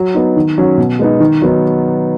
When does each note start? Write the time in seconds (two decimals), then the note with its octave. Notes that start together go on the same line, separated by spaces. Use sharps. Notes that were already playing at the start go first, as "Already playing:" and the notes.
Already playing: F#3
0.14 B3 D#4
0.37 D#3
0.58 F#3 C#4
0.78 B2
0.99 G#3 B3 D#4
1.20 D#3
1.42 F#3 B3 D#4